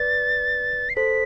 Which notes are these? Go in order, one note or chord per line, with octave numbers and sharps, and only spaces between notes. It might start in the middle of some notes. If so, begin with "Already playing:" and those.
Already playing: B4 D5 A6
C7
A4 C5 B6